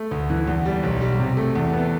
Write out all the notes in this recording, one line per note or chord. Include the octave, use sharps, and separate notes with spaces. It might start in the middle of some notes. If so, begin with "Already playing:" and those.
Already playing: A3
D2
E3
E2
G3
B1
G3
C3
A3
E2
B3